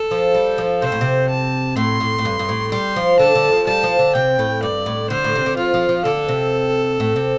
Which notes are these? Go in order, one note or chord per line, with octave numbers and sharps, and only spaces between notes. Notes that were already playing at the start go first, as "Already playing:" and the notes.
Already playing: A4
F3
G3
F3
C3 C5
A2
C3
A5
A2 C6
A2
A2
G2
G2
A2
G3 C6
F3
D3 A5
D3
F3
G3 A5
F3
D3
C3 G5
A2
G2 D5
A2
D3 C5
A2
C3
D3
F3 F4
F3
F3
D3 A4
C3
A2
C3